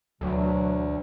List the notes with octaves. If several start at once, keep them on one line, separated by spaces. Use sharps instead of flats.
D2 B2 E3 F#3